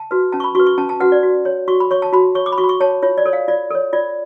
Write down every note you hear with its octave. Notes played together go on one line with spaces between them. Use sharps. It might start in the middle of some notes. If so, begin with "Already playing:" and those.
Already playing: A5
F#4 B4
C#4 A5
C#6
B5
F#4 B4 C#6
C#6
C#4 A5
A5
F#4 B4 F#5
D5
F#4
C#5
F#4 C#6
B5
C#5 C#6
A5
F#4 B5
C#5 C#6
D6
B5
F#4 C#6
B5
C#6
C#5 A5
F4 C#5
D5
A4 C#5
F5
F4 D5
A4 C#5
F4 D5